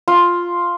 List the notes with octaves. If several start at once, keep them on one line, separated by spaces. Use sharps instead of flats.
F4